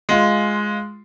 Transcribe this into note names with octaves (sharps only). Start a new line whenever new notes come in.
G#3 F4